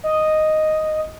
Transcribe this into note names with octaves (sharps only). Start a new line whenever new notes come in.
D#5